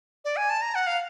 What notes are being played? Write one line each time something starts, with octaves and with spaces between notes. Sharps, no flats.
D5
G#5
A5
A#5
F#5
F5